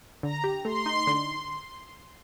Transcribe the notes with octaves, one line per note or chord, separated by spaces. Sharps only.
D3 A#5
G4
A3 C6
D#4
D3